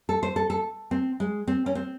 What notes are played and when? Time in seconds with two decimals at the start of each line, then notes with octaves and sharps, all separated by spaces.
0.09 A4
0.23 C5
0.36 A4
0.50 A4
0.91 C4
1.20 G#3
1.48 C4
1.66 C#4
1.75 C4